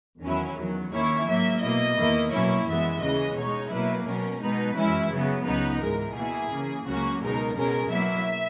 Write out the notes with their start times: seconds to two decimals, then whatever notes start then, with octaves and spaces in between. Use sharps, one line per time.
0.22 E2 D#3 F#3 C#4 E4
0.57 E2 D#3 F#3
0.92 D#2 D#3 A#3 C#4 E4 C#5
1.27 G#2 F#3 A#3 E5
1.61 B2 A#3 E4 D#5
1.97 E2 D#3 A#3 E4
2.32 B2 F#3 A#3 C#4 E4 C#5
2.66 F#2 E3 G#3 B3 E5
3.01 D#2 C#3 E3 G#3 C#4 D#5
3.36 B2 G#3 D#4 C#5
3.71 B2 F#3 A#3 E4 B4
4.06 B2 F#3 C#4 A#4
4.41 B2 G#3 D#4 B4
4.75 F#2 E3 G#3 C#4 E4
5.11 C#3 F#3 B3
5.45 C#2 C#3 F#3 B3 D#4 B4
5.80 G#2 E3 G#3 A#4
6.15 B2 A#3 E4 G#4
6.50 C#3 E3 A#3
6.86 C#2 C#3 F#3 A#3 C#4 F#4
7.21 C#2 B2 G#3 D#4 A#4
7.55 B2 G#3 C#4 A#4
7.90 B2 F#3 A#3 E4 E5